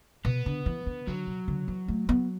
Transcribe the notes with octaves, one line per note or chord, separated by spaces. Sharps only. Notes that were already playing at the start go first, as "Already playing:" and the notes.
B2 B3
D3
E3
D3
D3 F#3
B2
D3
E3
A3
B3